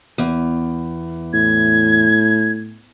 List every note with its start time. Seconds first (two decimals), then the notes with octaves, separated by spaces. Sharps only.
0.18 E2
1.33 A2 G#6